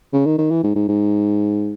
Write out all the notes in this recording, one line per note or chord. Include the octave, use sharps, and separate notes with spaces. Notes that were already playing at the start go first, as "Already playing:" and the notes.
C#3
D#3
D#3
E3
G#2
G#2
G#2